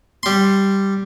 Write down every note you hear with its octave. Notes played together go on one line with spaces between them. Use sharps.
G3 C6